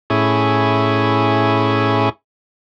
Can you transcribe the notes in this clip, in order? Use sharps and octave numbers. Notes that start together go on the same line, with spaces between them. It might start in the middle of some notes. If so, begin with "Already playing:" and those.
A2 C#4 E4 G#4